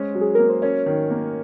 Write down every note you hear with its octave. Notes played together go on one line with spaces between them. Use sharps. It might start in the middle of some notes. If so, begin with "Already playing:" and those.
Already playing: G#3 C#4 C5
F#3
G#4
A#3 A#4
C5
C#4 A#4 C#5
D#3
A#3